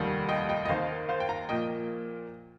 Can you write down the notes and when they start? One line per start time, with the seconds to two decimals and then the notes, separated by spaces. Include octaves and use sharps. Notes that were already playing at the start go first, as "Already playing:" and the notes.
Already playing: F1 D#2 D#3 G3
0.29 D#5 G5
0.49 D#5 G5
0.65 D#5
0.68 D#2 D#3 A#3 C5 F5
1.09 C5 F5
1.20 G5
1.29 F5 A#5
1.49 A#2 F3 A#3 D#5 G5